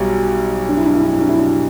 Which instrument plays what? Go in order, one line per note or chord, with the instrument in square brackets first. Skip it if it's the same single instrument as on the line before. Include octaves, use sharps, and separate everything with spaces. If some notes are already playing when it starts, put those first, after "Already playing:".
Already playing: [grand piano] B1 B2 G3
[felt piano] D4
E4
D4
E4
D4
E4
D4
E4
D4
E4